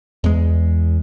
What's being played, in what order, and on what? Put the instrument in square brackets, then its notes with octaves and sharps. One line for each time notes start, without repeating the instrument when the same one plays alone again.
[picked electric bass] E2 G#3